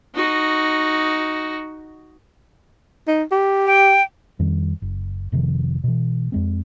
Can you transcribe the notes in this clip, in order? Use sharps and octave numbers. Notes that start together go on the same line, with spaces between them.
D#4 F#4
D#4
G4
G5
F2 D#3 G3
F#1
F1 C3 D#3 F3
B2 E3
F2 G#3 C4